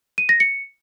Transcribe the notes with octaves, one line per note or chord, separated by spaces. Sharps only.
D#7
A#6
C#7